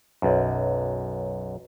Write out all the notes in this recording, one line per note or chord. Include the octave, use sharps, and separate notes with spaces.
B1 F#2